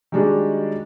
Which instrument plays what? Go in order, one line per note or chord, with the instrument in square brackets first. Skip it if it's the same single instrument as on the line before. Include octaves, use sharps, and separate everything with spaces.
[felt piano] D#3 G3 G#3 D4 F#4